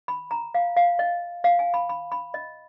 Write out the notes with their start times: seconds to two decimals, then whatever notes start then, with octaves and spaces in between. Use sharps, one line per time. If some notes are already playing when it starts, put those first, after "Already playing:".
0.08 B5
0.31 A#5
0.54 F5
0.77 F5
0.99 D#5
1.44 F5
1.59 G#5
1.74 B5
1.89 B5
2.12 B5
2.34 D#5